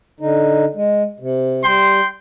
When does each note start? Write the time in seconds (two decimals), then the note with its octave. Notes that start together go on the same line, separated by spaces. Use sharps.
0.21 D3 D#4
0.76 G#3
1.20 C3
1.63 G3 G5 C6